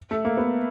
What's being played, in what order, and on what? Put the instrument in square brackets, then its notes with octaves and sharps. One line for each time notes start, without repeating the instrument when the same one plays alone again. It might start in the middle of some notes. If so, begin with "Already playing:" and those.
[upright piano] A3
A#3
B3